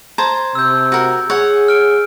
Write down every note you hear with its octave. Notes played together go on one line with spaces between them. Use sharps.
C5 A5 A#5 G#6
C3 E6 G6
F#4 A#4
G#4 C#5 F#5
F6 D7